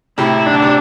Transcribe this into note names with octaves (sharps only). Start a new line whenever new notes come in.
A2 C3 E4
D3 D4
C3